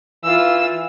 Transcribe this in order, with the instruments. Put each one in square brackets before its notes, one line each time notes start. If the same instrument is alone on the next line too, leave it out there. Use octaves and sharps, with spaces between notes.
[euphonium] E3 [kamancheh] F4 E6